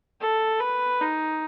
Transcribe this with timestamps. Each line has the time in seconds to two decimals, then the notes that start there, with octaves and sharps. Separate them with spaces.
0.20 A4
0.60 B4
1.01 D#4